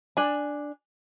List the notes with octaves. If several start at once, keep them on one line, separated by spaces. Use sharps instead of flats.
D4 G#5